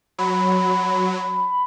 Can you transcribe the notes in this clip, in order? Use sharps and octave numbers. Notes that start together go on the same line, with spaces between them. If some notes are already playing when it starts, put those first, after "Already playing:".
F#3 B5